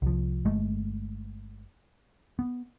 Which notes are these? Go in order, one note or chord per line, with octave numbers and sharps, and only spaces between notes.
C2 F3
G1 G#3 A3
B3